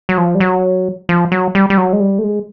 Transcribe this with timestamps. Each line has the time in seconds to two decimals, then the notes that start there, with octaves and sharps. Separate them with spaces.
0.09 F#3
0.18 F3
0.35 G3
0.40 F#3
1.09 F3
1.32 F#3
1.55 G3
1.70 G3
1.78 F#3
1.93 G#3
2.00 G3
2.19 A3
2.23 G#3